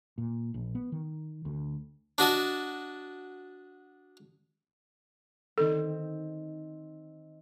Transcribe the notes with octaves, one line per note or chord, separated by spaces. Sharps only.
A#2
A#1
B3
D#3
D2
D4 F#4 D#5 A5
D#3 C4 A4